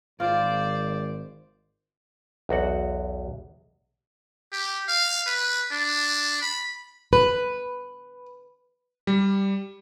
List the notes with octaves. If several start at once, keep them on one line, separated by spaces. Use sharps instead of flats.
G#1 F4 C5 D5
B1 E2 F#4 F#5
G4
F5
B4
D4
B5
B4
G3